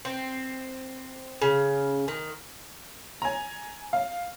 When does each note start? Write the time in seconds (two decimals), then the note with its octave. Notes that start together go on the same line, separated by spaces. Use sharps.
0.05 C4
1.42 C#3
2.08 D#3
3.22 G#5 A#5
3.93 F5